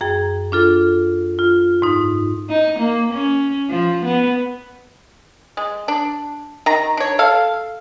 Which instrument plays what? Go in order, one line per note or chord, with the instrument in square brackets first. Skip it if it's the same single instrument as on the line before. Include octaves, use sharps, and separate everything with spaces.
[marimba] F#2 G#4 G5
D4 F4 A4
F4
G#2 D#4
[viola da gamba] D#4
A#3
C#4
F3
B3
[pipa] G#3
D4
D#3 A#5
D4 C#5
A4 F5